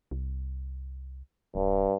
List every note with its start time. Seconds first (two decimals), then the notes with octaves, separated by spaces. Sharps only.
0.11 C2
1.55 D#1 G2